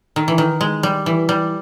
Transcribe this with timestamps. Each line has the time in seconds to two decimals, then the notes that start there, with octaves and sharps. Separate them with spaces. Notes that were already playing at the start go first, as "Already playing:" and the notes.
0.16 D#3
0.28 E3
0.38 D#3
0.61 G#3
0.83 G3
1.06 E3
1.29 G3